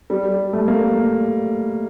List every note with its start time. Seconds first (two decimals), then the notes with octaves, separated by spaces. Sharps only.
0.10 G3
0.53 A3
0.68 A#3